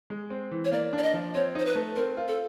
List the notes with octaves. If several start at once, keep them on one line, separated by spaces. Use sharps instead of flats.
G#3
C4
E3
C#5
A#3 D5
D4
D5
D#5
F3
C4 C#5
D#4 C5
B4
A3
C4 A#4
F4
A4